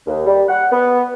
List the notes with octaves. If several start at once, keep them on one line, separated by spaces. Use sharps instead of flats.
D#2
G3
F#5
B3